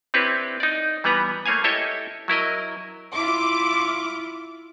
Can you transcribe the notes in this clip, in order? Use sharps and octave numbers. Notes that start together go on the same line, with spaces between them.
C4 D4 E4 G4 B4 C#5
D#4 D5
E3 G3 B3 B4 A#5
A3 A#3 C#5 F5 G#5
E4 G4 A4 C#5 D#5 E5
F#3 E4 A#4 D#5
E4 F4 D6